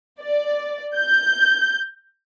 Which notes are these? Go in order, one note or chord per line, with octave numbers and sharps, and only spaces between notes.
D5
G6